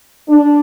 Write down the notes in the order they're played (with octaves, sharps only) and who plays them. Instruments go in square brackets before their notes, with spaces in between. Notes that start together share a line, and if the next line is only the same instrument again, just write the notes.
[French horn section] D4